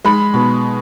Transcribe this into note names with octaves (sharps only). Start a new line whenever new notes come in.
G#3 B5
B2